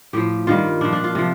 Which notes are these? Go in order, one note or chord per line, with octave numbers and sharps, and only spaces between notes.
A2 F3 G4
G2 D#3 G3 F4
A#2 F3 D4
D4
F4
C3 F3